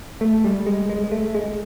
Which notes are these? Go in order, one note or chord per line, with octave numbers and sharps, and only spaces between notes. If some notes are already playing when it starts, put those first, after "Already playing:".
A3
G3
G#3
G#3
G#3
A3
G#3